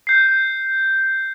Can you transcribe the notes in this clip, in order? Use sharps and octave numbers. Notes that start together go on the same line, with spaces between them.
G6 C7